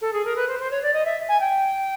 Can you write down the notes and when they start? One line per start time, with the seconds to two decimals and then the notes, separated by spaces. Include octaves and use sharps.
0.01 A4
0.13 G#4
0.25 A#4
0.36 B4
0.48 C5
0.59 C5
0.70 C#5
0.83 D5
0.93 D#5
1.05 E5
1.29 G#5
1.40 G5